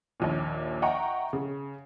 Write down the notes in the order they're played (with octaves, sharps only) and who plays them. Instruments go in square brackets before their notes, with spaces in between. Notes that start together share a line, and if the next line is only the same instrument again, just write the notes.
[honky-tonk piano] A#1 D#2 A#2
D#5 E5 F#5 G5 A#5 C#6
C#3